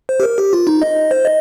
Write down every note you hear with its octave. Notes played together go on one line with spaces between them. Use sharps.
C5
G4
A#4
G4
F4
D#4
D#5
C5
D#5